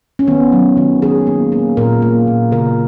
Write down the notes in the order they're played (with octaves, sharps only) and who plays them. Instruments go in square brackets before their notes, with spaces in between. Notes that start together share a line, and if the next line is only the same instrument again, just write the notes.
[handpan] C#4
D#3 B3
F#3
D#3
D#3 G#4
A#3
A#3
A#2 A#4
A#3
A#2
C#3 A#4